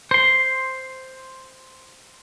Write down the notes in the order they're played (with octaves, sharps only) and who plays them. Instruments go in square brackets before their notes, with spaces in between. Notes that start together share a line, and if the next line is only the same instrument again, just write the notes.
[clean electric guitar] C5 C6